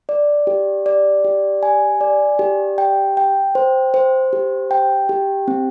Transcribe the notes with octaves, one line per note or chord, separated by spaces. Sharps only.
D5
G4
D5
G4
G#5
D5
G4
G5
G5
C5
C5
G4
G5
G4
C4